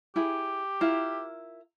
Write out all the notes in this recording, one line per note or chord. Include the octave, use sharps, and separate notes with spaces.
E4 G4 G#4
E4 F4 A#4